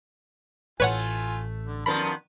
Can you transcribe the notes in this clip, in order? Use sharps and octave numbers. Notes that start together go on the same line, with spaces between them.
A1 A3 F4 B4 C#5 F#5 G#5
D3
F2 D#3 B3 A#4 A5 B5 C6